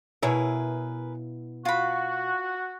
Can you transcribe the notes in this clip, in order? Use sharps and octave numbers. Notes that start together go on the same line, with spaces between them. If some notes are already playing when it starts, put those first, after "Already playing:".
B2 E4 G#4 A#4 B4 C#5
F4 F#4 B5